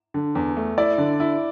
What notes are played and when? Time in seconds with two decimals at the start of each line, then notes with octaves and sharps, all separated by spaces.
0.14 D3
0.35 E2
0.57 A3
0.78 E4 D5
0.98 D3
1.20 E4